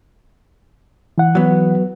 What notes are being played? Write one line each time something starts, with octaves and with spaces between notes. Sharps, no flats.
E3 F#5
F#3 B3